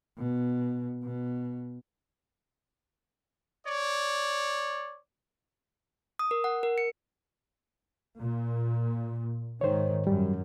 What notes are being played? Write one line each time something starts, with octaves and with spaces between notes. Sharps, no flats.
B2
B2
C#5 D5
D#6
A#4
F#5
A#4
C#7
A#2
G#2 D#3 C5 C#5
F#2 G3